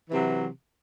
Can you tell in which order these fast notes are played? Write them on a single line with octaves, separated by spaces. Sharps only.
E3 C3 F#3